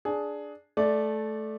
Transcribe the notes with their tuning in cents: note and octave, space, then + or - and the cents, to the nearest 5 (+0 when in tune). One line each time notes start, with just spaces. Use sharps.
D4 +0 G#4 +10
A3 -15 D5 +0